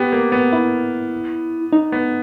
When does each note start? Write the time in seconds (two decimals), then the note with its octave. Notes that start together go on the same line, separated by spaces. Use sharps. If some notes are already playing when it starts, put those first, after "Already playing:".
Already playing: B3 G4
0.13 A#3
0.32 B3
0.53 E4
1.73 D#4
1.92 B3